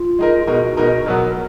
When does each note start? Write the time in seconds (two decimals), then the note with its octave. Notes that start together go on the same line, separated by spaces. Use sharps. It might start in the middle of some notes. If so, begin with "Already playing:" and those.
Already playing: F4
0.19 G#3 D#4 A#4
0.47 B2 G#3 D#4 F#4 A#4
0.77 B2 G#3 D#4 A#4
1.05 B2 F#3 B3 A#4